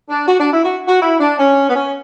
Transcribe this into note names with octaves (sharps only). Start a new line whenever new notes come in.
D4
F#4
D4
E4
F#4
F#4
E4
D4
C#4
B3
C#4